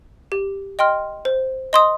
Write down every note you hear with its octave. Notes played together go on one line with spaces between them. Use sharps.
G4
D#5 G5 C6 F6
C5
D#5 C6 D#6